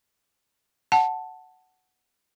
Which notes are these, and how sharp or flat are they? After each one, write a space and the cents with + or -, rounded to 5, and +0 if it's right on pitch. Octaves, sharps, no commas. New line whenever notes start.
F#5 +0 A5 +0